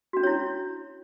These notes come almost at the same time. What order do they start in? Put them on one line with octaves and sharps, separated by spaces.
F#4 D4 C#4 C#5 E4